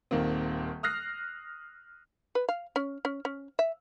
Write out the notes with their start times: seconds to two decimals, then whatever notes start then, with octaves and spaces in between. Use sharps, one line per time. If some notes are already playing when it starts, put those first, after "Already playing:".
0.11 D#1 D#3 A#3 C4
0.83 D#6 F6 F#6 A#6 C7
2.35 B4
2.49 F5
2.76 C#4
3.05 C#4
3.25 C#4
3.59 E5